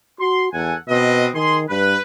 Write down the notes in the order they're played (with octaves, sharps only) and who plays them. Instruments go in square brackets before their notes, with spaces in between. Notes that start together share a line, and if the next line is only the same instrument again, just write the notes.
[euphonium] F#4 [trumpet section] C6
[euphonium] E2 [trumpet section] A4 F#5 G#5
[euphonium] B2 [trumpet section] C4 B4 D#5
[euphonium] D#3 [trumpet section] G#4 C6
[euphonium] G2 [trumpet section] B4